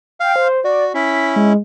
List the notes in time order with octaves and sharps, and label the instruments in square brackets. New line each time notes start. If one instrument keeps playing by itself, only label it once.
[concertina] F5 [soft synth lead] G5
[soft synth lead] C5
[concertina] F#4 [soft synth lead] D5
[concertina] C#4 E4 [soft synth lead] B6
[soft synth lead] G#3